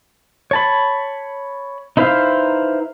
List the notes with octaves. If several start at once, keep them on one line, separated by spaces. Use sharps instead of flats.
C#5 A5 B5
D#4 E4 B4 C5 F5